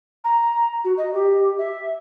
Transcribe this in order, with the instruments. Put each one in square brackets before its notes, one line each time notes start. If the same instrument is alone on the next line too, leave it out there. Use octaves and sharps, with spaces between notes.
[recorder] A#5
F#4
D#5
G4
E5